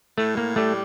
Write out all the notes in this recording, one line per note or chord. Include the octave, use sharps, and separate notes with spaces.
A2 A3
A#3
G3 A3